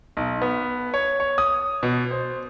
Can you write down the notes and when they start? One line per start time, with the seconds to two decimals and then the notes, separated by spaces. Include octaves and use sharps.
0.17 B1
0.42 B3
0.94 C#5
1.20 C#5
1.38 D#6
1.83 B2
2.11 C5